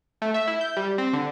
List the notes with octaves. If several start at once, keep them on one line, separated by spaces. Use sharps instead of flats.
A3
E5
E4
G6
G3
C4
D3